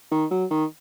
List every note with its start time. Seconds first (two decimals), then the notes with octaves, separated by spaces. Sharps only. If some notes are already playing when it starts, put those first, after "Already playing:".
0.11 D#3
0.31 F#3
0.50 D#3